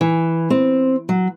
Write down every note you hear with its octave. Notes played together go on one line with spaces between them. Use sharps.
E3
C4
F#3